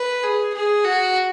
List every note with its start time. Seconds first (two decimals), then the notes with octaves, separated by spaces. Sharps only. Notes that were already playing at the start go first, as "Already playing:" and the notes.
Already playing: B4
0.23 G#4
0.54 G#4
0.84 F#4